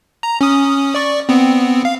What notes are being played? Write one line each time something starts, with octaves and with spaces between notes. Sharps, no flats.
A#5
C#4 D#6
D5 C#6
B3 C4
F5